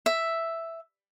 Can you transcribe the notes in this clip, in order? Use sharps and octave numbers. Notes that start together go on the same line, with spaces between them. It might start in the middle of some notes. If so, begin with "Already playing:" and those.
E5